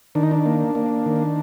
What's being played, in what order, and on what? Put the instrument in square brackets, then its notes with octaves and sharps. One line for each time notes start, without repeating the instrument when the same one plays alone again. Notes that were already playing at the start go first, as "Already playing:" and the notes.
[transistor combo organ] D#3 D4
D#4
D4
A#3
A#3
D#3